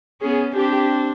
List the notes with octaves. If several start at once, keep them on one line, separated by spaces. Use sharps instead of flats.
B3 C#4 G#4
C4 D4 G4